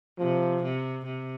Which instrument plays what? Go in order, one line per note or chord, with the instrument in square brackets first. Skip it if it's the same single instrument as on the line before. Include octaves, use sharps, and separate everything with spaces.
[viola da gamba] C3 [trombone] F3
[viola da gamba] C3
C3